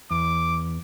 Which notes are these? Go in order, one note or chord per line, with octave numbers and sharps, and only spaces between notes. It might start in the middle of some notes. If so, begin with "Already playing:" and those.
E2 D6